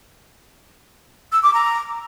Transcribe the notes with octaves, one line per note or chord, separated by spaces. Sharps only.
E6
D6
A#5